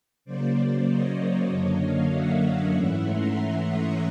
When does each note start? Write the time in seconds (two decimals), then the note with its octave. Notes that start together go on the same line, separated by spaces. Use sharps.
0.25 C#3 F#3 A#3 C5 D5
0.86 C#5 D#5
1.49 F#2 D3 F#3 A#3 D4 C#5 D#5
1.79 D#5 F5
2.10 E5 F#5
2.73 G#2 E3 A3 C#4 E4
3.04 A#5 C6
3.66 C#6 D#6